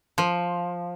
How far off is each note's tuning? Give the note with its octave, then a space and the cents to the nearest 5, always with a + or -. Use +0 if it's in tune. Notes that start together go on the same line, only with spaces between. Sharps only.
F3 +5